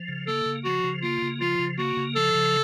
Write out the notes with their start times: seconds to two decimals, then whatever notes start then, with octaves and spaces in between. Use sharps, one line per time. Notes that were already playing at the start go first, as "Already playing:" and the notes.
Already playing: F3
0.08 C#3
0.27 A#3 A4
0.46 C#3
0.65 F3 F#4
0.84 C#3
1.02 A#3 F4
1.22 C#3
1.41 F3 F4
1.59 C#3
1.78 A#3 F#4
1.97 C#3
2.16 F3 A4
2.35 C#3